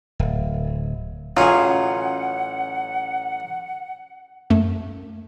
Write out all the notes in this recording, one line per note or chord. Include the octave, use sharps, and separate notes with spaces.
D1
A1 F#3 C#4 F4 G#4 F#5
F#2 A3